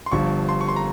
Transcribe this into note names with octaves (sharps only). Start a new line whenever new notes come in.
C6
G1 G2 F3 C#6
C6
C#6
C6
A#5